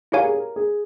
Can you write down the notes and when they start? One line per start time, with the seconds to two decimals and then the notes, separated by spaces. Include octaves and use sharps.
0.12 E4 G4 A#4 C#5 F5 G#5
0.24 G#4
0.34 A#4
0.56 G#4